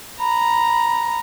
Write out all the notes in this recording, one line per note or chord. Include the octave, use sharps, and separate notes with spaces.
A#5 B5